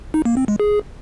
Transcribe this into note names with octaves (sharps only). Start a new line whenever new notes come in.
D#4
A#3
C4
G#3
G#4